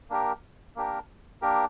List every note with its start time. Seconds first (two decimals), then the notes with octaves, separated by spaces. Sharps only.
0.10 A#3 D4 G4 A#4
0.76 A#3 D4 G4 A#4
1.42 A#3 D4 G4 A#4